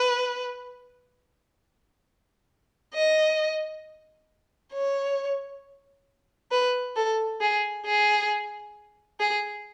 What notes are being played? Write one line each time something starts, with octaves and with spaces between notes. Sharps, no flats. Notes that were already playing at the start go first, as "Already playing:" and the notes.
Already playing: B4
D#5
C#5
B4
A4
G#4
G#4
G#4